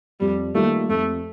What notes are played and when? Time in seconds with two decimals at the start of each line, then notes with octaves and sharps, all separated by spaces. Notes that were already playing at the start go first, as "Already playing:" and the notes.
0.20 F2 G3
0.55 D#3 G3 A3 A#3 F4
0.89 F2 A3